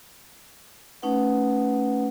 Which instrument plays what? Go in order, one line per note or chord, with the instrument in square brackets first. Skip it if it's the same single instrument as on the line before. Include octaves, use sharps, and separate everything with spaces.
[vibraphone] A3 C#4 D#4 B4 F#5